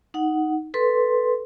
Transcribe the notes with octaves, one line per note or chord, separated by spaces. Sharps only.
D#4 F#5
A4 B4 C6